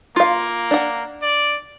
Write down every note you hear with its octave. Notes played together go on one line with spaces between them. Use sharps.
A#3 F4 F5
D4 F#5
D5